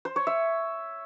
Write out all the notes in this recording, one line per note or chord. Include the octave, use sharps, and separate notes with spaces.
C5
C#5
E5